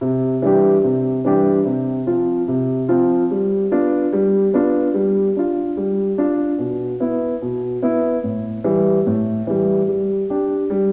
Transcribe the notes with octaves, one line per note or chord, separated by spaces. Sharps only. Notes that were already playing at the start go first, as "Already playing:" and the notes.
C3
E3 G3 D4 G4
C3
E3 G3 D4 G4
C3
F3 C4 F4
C3
F3 C4 F4
G3
B3 D4 F4
G3
B3 D4 F4
G3
D4 F4
G3
D4 F4
B2
B3 E4
B2
B3 E4
A2
E3 G3
A2
E3 G3
G3
D4 G4
G3